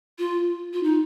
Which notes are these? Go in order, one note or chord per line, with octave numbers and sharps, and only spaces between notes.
F4
F4
D#4